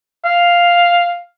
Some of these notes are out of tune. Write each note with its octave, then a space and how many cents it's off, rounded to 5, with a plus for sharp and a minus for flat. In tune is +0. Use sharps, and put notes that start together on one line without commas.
F5 +0